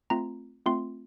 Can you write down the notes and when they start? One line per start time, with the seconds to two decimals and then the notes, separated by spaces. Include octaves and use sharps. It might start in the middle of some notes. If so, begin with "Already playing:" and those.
0.10 A3 C4 F4 A#5
0.66 A3 C4 F4 C6